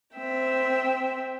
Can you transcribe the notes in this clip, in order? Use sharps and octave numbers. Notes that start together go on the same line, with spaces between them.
C4 E5 G5